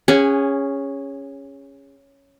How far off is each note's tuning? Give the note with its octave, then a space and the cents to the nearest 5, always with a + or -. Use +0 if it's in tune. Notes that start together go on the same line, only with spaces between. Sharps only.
C#4 +0 G#4 -20 F#5 +0